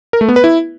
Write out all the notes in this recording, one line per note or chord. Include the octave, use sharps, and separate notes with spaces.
A#4
A3
B3
B4
E4